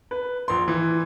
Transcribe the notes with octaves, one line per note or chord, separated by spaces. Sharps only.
B4
A#1 C6
E3